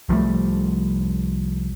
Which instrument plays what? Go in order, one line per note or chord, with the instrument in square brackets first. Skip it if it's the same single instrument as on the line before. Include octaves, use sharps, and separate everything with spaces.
[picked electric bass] C2 F3 G3 A3